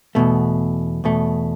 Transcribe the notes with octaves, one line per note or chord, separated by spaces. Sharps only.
E2 B2 A3
E2 B2 A3